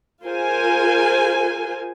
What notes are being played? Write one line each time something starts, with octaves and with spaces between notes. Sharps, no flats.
F4 G#4 A#4 C5 G#5